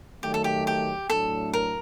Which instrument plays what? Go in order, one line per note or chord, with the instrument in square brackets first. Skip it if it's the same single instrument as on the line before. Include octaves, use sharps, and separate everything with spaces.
[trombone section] D#3 F#3 A3 [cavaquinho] G4
[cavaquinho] A4
G4
G4
[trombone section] A2 F#3 A3 D4 [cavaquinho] A4
[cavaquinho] A#4